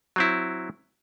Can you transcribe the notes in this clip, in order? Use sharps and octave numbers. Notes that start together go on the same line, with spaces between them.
F#3 C4 E4